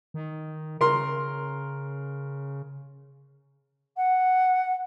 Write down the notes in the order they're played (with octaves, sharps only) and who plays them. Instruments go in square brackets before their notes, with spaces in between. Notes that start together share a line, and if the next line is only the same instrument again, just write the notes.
[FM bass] D#3
[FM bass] C#3 [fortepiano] A#4 C6
[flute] F#5